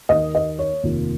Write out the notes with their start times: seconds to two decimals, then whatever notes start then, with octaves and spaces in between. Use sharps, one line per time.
0.09 D#2 D#3 A#3 D#5
0.35 D#5
0.59 C#5
0.83 F1 D#2 D#3 A#3 F4